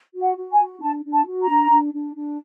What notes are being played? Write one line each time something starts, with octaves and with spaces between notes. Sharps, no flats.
F#4
F#5
F#4
G#5
F#4
D4 A5
D4
A5
F#4
A#5
D4
D4
D4
D4